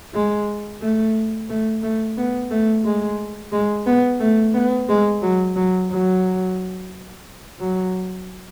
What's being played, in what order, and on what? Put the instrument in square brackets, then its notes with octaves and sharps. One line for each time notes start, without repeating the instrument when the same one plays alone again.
[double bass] G#3
A3
A3
A3
B3
A3
G#3
G#3
B3
A3
B3
G#3
F#3
F#3
F#3
F#3